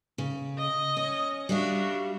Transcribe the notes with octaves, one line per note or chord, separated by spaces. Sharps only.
C#3
D#5
C#4
G3 D4 F#4 E5 F5